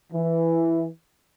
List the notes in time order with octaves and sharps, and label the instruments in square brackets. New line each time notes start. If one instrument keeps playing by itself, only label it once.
[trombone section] E3